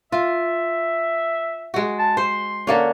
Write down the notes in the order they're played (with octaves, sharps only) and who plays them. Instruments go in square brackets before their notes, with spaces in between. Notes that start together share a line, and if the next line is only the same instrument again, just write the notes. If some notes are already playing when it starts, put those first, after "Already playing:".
[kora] F4 [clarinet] E5
[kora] G#3 F#4
[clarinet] A5
[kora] C5 [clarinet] C6
[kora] D3 A#3 C#4